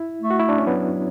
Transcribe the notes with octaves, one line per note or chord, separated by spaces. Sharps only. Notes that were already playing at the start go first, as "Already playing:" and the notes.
Already playing: E4
A3
F#4
E4
D4
C#4
F#3 B3